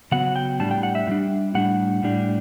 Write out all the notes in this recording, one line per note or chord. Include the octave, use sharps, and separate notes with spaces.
C#3 F#3 B3 F#5
G5
A2 G3 D4 A5
G5
F#5
E5
A2 G3 D4
A2 G3 D4 F#5
A2 G3 D4